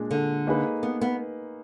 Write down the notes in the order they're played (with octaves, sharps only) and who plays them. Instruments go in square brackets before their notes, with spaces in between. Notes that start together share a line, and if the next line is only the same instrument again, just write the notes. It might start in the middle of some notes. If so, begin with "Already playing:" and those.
Already playing: [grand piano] A#2 G#3 D4
[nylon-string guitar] D3
[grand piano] A#3 D#4 G#4 B4
[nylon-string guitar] B3
B3